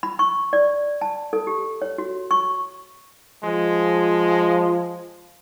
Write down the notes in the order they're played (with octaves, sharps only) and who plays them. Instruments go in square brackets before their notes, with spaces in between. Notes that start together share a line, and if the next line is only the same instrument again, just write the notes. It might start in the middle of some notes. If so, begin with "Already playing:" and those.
[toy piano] B5
C#6
D5
A5
A4
G4
C#5
F#4
C#6
[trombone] F3 [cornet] G#3